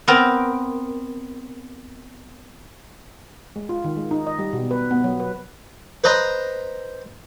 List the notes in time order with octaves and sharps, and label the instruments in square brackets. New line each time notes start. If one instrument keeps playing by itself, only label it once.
[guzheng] B3 C4 A#4
[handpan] G#3
F4
D#3
G#3
D#4
D#5
G3
B2
B4
B3
F#3
B4
[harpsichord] B4 C5 D#5 A#5